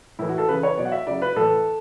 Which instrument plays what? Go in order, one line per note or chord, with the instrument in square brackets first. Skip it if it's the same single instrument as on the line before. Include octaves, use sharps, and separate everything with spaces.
[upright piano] A2 E3 E4
F#4
A4
C#3 E3 B4
C#5
B2 F#3 D5
F#5
E5
C#3 F#3 D5
B4
A2 E3 A4